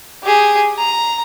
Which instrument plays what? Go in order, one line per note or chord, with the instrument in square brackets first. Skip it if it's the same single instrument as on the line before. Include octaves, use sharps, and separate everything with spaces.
[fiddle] G4 G#4
A#5